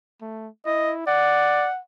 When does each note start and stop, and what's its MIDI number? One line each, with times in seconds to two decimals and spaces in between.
0.21 0.48 57
0.66 1.03 64
0.66 0.91 75
1.07 1.67 74
1.07 1.79 78